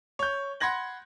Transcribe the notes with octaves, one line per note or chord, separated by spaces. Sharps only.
C#5 G6
F#5 B5 C6 G#6 A#6 F#7